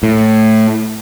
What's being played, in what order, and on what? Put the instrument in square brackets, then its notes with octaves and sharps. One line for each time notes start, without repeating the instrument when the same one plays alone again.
[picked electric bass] A2